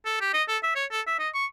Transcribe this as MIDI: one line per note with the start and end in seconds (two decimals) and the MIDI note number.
0.05 0.20 69
0.20 0.29 67
0.33 0.43 75
0.48 0.58 69
0.63 0.70 76
0.75 0.85 73
0.91 1.01 69
1.06 1.16 76
1.19 1.29 75
1.34 1.46 85